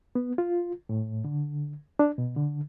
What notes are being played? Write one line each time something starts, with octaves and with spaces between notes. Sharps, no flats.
B3
F4
A2
D3
D4
B2
D3